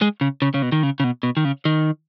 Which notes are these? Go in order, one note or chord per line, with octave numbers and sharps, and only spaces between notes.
G#3
C#3
C#3
C#3
B2
D#3
C#3
C#3
B2
B2
D#3
C#3
D#3